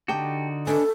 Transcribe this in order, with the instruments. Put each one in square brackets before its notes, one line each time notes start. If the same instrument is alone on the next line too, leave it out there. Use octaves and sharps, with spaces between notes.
[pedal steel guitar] D3 D#4 F#4 [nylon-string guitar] G4 G5 A5
[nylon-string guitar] B3 D#5 G#5 [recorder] D4 [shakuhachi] A4